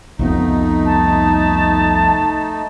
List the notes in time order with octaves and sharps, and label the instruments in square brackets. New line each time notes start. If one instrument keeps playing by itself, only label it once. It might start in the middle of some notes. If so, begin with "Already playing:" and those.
[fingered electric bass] C2 F2 B3 [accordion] A3 D#4
[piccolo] A5